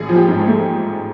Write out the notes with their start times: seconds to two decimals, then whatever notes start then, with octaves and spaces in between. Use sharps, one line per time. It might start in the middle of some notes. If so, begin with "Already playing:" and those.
Already playing: A1 G#4
0.09 F3
0.16 G4
0.28 G#2
0.41 G#4
0.47 A3